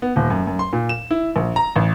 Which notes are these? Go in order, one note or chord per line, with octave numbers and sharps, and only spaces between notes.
B3
D#1
F#2
F#2
C6
A#2
E7
E4
A#1
A#5
A1